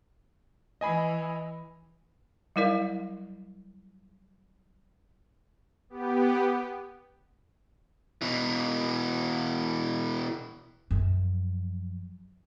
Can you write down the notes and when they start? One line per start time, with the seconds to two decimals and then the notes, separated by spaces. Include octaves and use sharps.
0.81 E3 D#5 G#5 B5
2.56 F#3 G3 E4 A#4 D5 F5
5.90 B3 G4
8.22 B2 E3
10.91 F#2 F3